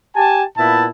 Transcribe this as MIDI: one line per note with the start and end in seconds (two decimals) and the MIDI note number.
0.16 0.43 67
0.16 0.43 80
0.16 0.43 81
0.57 0.88 46
0.57 0.88 59
0.57 0.88 64
0.57 0.88 76
0.57 0.88 81